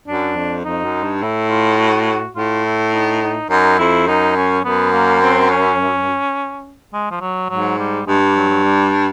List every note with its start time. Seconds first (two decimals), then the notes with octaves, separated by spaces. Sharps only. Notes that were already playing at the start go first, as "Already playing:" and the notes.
0.08 F#2 D4
0.36 F2
0.64 F2 D#4
0.84 F#2
1.03 G2
1.22 A2 E4
1.50 F4
1.79 F#4
2.36 A2 F4
2.65 E4
2.94 D#4
3.22 D#4
3.50 F#2 D#4
3.78 F2 E4
4.07 F#2 D#4
4.36 C#4
4.64 F#2 B3
4.93 A#3
5.21 C4
5.50 C#4
6.93 G#3
7.11 F3
7.21 F#3
7.50 G#2 F#3
7.79 G3
8.07 G2 G#3
8.21 G3
8.36 F#3
8.49 F#3
8.64 G3